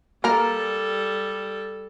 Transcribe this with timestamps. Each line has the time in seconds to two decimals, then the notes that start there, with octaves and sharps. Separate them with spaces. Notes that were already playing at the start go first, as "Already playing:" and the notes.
0.24 G3 A#3 A4 A#4